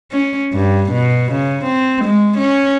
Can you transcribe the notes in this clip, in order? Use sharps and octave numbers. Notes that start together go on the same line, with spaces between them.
C#4
G2
B2
C#3
C4
G#3
C#4